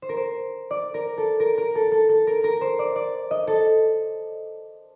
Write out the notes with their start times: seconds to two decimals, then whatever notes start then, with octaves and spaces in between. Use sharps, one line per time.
0.02 C5
0.09 A#4
0.17 C5
0.71 D5
0.94 A#4
1.18 A4
1.40 A#4
1.58 A#4
1.75 A4
1.92 A4
2.09 A4
2.27 A#4
2.44 A#4
2.61 C5
2.79 D5
2.96 D5
3.31 D#5
3.47 A4